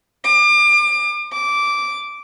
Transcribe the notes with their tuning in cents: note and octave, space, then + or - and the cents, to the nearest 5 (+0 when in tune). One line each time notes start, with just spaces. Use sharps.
D6 +35
D6 -10